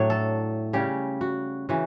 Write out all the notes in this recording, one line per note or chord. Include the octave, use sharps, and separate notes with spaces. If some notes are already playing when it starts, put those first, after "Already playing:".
Already playing: A2 F#3 A3 D4 C#5
A4
C#3 G3 C#4 G4
F#4
C#3 E3 F#4